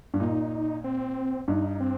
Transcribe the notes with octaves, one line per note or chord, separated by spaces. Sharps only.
G2
A#2 D#4
C4
G2 D#4
C4